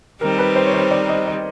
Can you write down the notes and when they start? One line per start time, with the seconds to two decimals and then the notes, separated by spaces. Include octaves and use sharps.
0.21 D#3 G3 C4 D#4 A#4
0.39 B4
0.56 C5
0.66 C#5
0.74 C5
0.91 D5
1.09 D#5
1.27 D#5